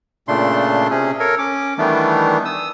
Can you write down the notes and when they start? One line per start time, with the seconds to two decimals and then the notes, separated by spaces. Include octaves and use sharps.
0.28 A#2 C#3 A3 D4 C6
0.90 C3 C#4 G#4
1.20 A4 A#4 C#5
1.38 C#4 D6
1.78 D#3 E3 G3 A3 B3 D4
2.45 D#6 E6